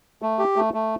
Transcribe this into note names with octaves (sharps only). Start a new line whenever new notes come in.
A3
G4
A3
A3